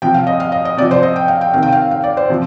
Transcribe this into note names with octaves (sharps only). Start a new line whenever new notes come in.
C3 F3 G5
F5
D#5
F5
D#5
D#5
C3 F3 D5
C5
D#5
G5
F5
G5
C3 D#3 F5
G5
F5
F5
D5
C5
C3 F3